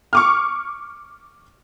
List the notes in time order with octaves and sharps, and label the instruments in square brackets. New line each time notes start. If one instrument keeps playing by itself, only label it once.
[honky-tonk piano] C#6 D6 F6